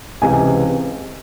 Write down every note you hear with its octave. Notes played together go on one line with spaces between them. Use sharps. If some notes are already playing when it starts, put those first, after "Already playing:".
C#2 C3 E3 G#5